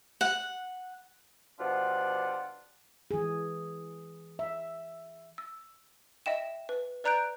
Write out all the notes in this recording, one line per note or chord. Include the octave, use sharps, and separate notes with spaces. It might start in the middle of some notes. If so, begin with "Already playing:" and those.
F#5
B2 F3 D4 F4 G4 F#5
E3 G#4
E5
E6
D#5 E5 G5 E7
B4
B4 D5 A#5 F#6 G6 D7